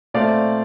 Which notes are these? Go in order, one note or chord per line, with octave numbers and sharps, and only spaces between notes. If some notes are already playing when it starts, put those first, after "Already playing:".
A#2 A3 C4 D5 F5